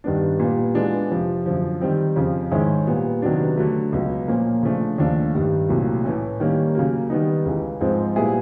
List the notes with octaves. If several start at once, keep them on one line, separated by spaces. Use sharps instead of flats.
G2 D#3 G3 B3 D4
A#2 G3 B3
E3 G#3 B3 D4 F4
F2 C3 F3
F#2 D3 F3
D#3 G3 C4
F2 C#3 F3
G#2 D#3 G#3 C#4 E4
A#2 G3 B3
C3 D#3 F#3 B3 D4
D3 F#3 A3
C#2 B2 F#3
A#2 F3 A#3 C#4
C#3 F3 A3 D4
D#2 C#3 F3 A3 D4
G2 D#3 G3
C2 A#2 F#3 A3
A2 E3 A3 C#4
D#3 G3 A#3 C#4
C#3 F#3 A#3
D#3 G3 B3 D#4
C#2 C#3 E3
G#2 F3 G#3 C4
A#2 G3 B3 E4 G#4